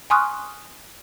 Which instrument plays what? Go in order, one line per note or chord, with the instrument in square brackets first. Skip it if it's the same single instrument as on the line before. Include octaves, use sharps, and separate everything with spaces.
[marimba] G#5 C6 C#6 D#6 F6 F#6